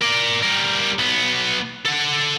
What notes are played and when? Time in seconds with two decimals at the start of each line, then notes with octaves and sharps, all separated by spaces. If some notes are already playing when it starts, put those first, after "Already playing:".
0.02 A#4 D5
0.43 G3 A#4
0.99 B1 B3
1.85 A4 F#5